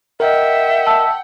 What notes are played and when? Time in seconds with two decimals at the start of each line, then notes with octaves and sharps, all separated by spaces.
0.20 A#4 D#5 E5 F#5 G5
0.87 A5 E6